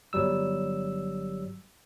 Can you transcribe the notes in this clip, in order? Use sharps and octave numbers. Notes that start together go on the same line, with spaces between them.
G1 F#3 G3 E6